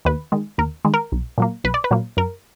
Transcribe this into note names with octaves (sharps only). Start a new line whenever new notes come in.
D#2 B4
D#3 G#3
D#2 A#4
D#3 G#3
A#4
B1
A#2 F#3 A#3
B1 B4
D5
B4
A#2 F#3 A#3
F#2 A#4